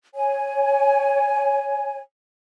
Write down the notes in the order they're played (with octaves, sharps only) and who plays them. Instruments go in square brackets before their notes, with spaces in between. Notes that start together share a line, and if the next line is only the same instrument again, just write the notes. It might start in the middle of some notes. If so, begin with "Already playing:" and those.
[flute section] C#5 G#5